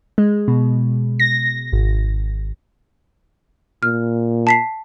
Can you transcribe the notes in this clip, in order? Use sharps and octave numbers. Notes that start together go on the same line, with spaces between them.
G#3
B2
A#6
G#1
A#2 F6
A5 B6 C7